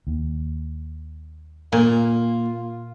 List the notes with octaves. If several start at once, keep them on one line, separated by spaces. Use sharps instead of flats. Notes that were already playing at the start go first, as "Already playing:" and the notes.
D#2
A#2 A#3 F4